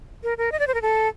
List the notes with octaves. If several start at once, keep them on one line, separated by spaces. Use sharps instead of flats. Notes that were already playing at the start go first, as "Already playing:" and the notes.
A#4
A#4
D#5
D5
C5
A#4
A4